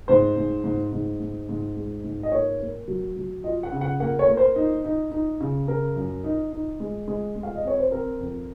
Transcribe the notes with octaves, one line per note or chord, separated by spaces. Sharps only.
G#2 C5
G#2
G#2
G#2
G#2
G#2
G#3
G#2
D#5
A#3 C#5
A#3
F#3
F#3
F4 D#5
F#5
C#3
F#5
A#3 F#5
C#5
A#3
C5
D#4
D#4
D#4
C#3
C#3 A#4
F#2
D#4
D#4
G#3
G#3
G#3
F5
D#5
C4 C#5
C5
C4 A#4
F2